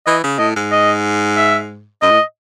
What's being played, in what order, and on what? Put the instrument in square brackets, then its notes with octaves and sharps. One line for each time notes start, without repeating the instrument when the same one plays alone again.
[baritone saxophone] E3 [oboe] D#5
[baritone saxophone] C#3
[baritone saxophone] A2 [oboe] D#5
[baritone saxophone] G#2
[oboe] D#5
E5
[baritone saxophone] F#2 [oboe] D#5
[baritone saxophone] A2